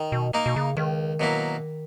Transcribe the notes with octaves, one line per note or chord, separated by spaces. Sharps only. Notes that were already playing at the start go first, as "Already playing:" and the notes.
Already playing: D#3
B2
A#3 D#4 A#4
B2
C#3
C#2 D#3
B2 F#3 A#3 E4